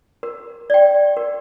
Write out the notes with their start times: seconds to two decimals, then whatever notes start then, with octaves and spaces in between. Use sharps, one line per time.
0.23 A#4
0.70 D5 G5
1.17 A#4